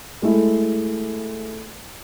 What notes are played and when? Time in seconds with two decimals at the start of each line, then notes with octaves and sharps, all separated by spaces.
0.22 G#3 A3 E4